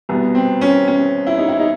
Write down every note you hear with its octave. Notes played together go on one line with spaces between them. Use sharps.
C2 B2 B3
C4
C#4
C#4
E4
D#4
E4
D#4